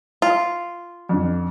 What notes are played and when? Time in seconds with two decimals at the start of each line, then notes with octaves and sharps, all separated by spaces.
0.22 F4
1.09 F2 D3